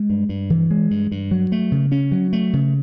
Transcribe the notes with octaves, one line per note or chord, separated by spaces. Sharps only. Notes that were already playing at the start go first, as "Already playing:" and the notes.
Already playing: G#3
G2
G2
E3
G#3
G2
G2
F#3
A3
C#3
C#4
F#3
A3
C#3